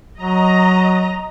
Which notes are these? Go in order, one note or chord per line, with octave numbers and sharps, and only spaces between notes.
F#3 D#5 A#5